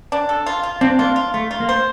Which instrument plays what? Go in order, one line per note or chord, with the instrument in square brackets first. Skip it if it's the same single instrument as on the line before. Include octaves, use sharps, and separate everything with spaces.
[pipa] D4
A4
F4
F4
[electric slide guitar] C4 [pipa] D4
[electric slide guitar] A#3 [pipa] F4
[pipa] F4
[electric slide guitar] A3 [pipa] F4
[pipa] F4
[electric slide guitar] A#3
[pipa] C5